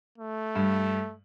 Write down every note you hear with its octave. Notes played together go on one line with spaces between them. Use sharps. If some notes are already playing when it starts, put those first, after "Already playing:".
A3
G2